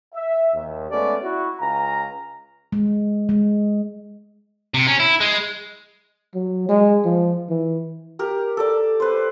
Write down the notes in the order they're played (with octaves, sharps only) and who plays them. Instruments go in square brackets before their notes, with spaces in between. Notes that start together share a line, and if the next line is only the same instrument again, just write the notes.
[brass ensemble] E5
D#2
G#3 A3 B3 C#4 D5
E4 F#4
C#2 F5 G#5 A#5
[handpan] G#3
G#3
[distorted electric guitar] C3
C#4
E4
G#3
[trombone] F#3
G#3
F3
E3
[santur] G4 A#4
A4 D5
B4 C5